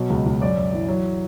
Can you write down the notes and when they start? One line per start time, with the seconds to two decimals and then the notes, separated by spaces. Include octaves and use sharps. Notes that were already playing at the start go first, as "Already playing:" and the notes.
Already playing: B2 F#3
0.10 C#2
0.26 C#2
0.41 F#2 D5
0.57 F#2
0.73 E3
0.88 F#3